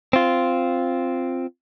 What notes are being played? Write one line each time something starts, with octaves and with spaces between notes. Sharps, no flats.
C4 F4